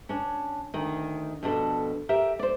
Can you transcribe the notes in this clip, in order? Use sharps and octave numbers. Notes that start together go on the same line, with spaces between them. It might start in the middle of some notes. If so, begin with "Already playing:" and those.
C#4 D4
D2 D#3
F2 B2 D4 A4
G4 A#4 E5
C5 D5